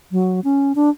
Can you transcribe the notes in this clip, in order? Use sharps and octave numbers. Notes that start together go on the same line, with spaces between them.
F#3
C#4
D4